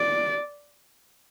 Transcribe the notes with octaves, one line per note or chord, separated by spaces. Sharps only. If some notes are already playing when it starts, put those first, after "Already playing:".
Already playing: D5